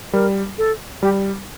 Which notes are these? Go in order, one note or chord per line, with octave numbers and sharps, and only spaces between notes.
G3 A#4
A4
G3 G4